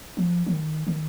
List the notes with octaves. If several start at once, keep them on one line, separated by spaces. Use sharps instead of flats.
F3
F3
D#3
D#3